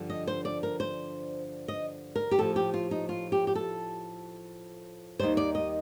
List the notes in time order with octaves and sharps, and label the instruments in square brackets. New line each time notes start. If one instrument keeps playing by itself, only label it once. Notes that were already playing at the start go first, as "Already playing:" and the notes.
Already playing: [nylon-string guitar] G2 D3 F3
D#5
C5
D5
A#4
C5
D#5
A#4
G4
A2 F3 A4
G4
F4
D#4
F4
G4
G4
A4
D#2 D#3 G3 C5
D5
D#5